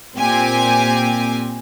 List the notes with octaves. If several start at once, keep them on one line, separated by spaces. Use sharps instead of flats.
A#2 C4 G4 G#5